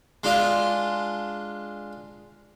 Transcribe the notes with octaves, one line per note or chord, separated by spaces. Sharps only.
G#3 D4 F4